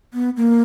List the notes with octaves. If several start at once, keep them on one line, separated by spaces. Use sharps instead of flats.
B3
A#3